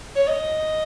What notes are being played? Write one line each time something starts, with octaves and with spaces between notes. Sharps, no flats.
C#5
D#5